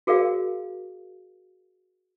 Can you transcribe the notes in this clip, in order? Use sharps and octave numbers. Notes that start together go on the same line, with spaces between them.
F#4 G#4 A#4 D5 F5